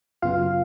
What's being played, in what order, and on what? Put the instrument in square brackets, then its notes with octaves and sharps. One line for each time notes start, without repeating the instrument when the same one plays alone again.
[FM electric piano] F#2 C#3 F#3 B3 F4 F5